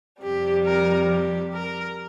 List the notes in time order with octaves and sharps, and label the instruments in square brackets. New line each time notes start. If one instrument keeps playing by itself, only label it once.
[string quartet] F2 C3 G3 [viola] G4
[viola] A#4
G4
A#4